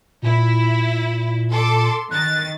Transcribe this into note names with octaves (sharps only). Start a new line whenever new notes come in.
A#2 E4
A4 C6 D6
D#3 F#6 A6